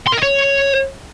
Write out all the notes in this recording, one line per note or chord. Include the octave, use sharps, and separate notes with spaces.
C6
A#4
D#5
C#5